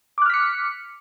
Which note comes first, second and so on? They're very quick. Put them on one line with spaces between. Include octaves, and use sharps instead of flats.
D6 F#6 F6 B6 C#7